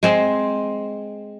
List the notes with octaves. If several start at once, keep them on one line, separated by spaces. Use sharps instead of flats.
G#3 C4 C5